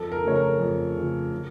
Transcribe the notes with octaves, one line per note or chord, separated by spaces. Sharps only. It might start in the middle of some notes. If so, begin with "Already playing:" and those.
Already playing: F2 A4
A#4
C#3 F3 A3 C#5
A#4
F2
C#3 F3 A3
C#3